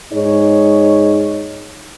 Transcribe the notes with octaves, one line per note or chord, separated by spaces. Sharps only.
G#2 D#4 G#4 C#5